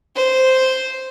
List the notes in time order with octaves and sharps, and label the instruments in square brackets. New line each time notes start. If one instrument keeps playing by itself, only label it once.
[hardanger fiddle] C5